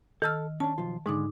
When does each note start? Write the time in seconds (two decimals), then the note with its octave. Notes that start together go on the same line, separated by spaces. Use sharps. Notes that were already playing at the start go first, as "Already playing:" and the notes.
0.22 D#3 A4 A5 E6 F6
0.60 C#4 D4 A5
0.78 B1 F3 F4
1.06 G#2 D3 G#3 D#4 D6